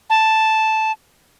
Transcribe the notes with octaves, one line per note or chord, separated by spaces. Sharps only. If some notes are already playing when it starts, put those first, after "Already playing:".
A5